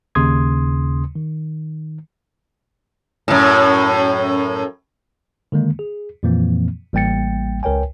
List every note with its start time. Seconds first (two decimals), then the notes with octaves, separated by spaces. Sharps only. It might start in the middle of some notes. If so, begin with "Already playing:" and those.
0.15 D#2 C#3 C6 D#6 G#6
1.16 D#3
3.28 F#2 A2
5.52 D3 D#3 G#3 A#3
5.79 G#4
6.23 F2 A#2 E3 F3 A#3 C4
6.93 A1 G3 A#3 G5 A6 C#7
7.63 C#2 A#4 C#5 G5 G#5